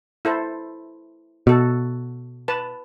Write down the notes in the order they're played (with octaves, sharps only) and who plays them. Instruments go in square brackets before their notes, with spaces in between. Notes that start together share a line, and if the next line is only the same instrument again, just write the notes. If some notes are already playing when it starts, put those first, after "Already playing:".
[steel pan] E4 A4 C5
[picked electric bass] B2 [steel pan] F#4 A4
[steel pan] B4 A5